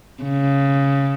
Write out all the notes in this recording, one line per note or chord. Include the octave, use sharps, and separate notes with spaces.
C#3